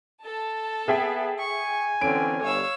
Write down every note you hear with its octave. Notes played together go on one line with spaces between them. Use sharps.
A4 A5
B3 G#4 E5 G5
G#5 C#6
D3 E3 C4 C#4 D7
G1 C#5 F5 E6